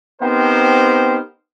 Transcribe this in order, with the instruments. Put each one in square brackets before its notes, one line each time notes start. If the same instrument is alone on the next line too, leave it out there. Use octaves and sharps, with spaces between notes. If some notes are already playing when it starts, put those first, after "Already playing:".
[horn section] B3 C4 D#4 G4 A#4 C5